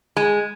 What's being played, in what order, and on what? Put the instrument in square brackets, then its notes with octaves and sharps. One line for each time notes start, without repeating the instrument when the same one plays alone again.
[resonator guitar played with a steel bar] G#3